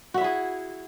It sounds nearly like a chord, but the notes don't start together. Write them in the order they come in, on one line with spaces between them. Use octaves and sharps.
F#4 E5 E4 G#4